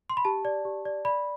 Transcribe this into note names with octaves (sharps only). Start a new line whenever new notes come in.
C6
B5
G4 A5
D5
G4
D5
D5 B5